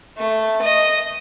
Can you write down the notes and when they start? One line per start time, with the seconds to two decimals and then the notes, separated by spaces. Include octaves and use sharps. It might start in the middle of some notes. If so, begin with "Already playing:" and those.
0.17 A3
0.61 D#5